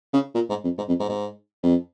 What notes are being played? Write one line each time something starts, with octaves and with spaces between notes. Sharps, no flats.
C#3
A#2
G#2
F2
G#2
F2
G#2
G#2
F2